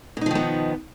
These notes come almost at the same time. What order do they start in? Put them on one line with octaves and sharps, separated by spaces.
B2 D#4 F3 D#3 B3